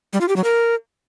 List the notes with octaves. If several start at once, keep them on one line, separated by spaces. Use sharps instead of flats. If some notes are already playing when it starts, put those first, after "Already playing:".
G3
F4
G4
F#3
A#4